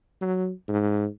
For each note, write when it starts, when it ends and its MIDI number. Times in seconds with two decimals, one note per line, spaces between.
0.21 0.51 54
0.68 1.06 44